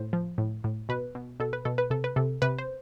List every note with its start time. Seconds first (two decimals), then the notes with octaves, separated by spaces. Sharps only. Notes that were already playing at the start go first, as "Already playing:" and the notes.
Already playing: A2 C5
0.13 F3
0.38 A2
0.64 A2
0.89 B2 B4
1.15 B2
1.40 B2 A4
1.53 B4
1.65 B2 A4
1.78 B4
1.90 C3 A4
2.04 B4
2.16 C3 A4
2.42 C3 B4
2.58 C5